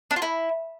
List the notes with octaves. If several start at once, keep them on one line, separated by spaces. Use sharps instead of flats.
D4
F4
E4